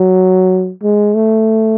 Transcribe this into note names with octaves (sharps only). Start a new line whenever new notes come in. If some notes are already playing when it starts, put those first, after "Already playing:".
Already playing: F#3
G#3
A3